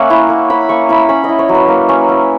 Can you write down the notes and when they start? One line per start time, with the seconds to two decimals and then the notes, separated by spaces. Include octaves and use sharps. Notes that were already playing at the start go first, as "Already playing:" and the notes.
Already playing: A#3 C#4 E5 F#5
0.10 E4
0.29 A#3
0.50 E4 B5
0.69 A#3 C#6
0.89 E4 B5
1.09 C#4 B5
1.24 E4 D#5
1.39 C#5
1.49 F#3
1.54 B4
1.68 A#3
1.89 C#4
2.09 E4